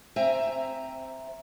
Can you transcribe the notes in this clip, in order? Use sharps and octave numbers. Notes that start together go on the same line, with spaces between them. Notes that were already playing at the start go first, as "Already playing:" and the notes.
C4 E5 G5 G#5 A#5